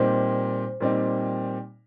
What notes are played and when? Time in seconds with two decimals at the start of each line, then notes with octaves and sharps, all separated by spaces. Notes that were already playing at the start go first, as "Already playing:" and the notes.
Already playing: A#2 G3 C4 D#4 C5
0.80 A#2 G3 C4 D#4